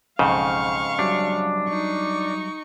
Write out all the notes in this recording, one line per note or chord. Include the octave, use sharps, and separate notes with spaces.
B1 F2 G#2 C#3 F5 C#6 G6
F#3 G3 D4 E5
D#4 C#6